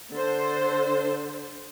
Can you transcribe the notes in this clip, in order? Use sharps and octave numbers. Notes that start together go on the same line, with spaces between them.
D3 C5